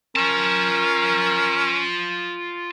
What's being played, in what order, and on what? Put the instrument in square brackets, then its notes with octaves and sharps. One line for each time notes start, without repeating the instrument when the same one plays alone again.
[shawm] C#4 [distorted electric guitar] F4 A5 [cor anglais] A#4